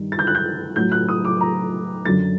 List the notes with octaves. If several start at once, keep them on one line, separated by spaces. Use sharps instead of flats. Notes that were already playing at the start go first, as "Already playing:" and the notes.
Already playing: G2 D#3 G3
A6
G6
F#6
G6
A2 F#3 G6
F#6
D#6
D6
A#5
F#2 D3 F#3 A6